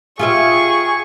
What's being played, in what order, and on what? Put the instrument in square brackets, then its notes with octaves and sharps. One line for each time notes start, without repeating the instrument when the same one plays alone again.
[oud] F4 G4 E5 [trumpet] G#4 [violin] C#6